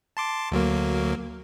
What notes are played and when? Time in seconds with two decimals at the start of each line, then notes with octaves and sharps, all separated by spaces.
0.17 A5 C6 D6
0.52 D2 F#3 A#3